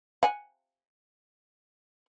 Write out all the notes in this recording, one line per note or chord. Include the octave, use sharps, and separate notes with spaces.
F#5 G#5